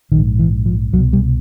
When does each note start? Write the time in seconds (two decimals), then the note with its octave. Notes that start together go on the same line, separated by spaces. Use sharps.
0.12 A#1 D#3
0.17 G#2
0.39 E3
0.66 F3
0.93 C2 F#3
0.98 B2
1.13 G3